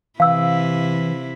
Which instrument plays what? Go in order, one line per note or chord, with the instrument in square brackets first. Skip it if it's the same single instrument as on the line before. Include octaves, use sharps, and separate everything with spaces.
[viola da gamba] C3 E4 [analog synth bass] E3 [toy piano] F5 E6